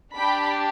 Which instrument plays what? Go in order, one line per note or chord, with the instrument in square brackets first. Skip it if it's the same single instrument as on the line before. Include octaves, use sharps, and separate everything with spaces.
[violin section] D4 G4 G5 B5